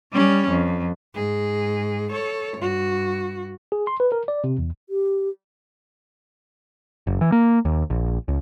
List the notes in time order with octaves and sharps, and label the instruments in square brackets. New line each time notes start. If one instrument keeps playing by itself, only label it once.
[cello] G3 C#4
F2
G#2 G#4
A4 C#5
G2 F#4
[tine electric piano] G#4
C6
B4
A#4
D5
C3
E2
[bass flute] G4
[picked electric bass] F#1
E3
A#3
D#2
A#1
C#2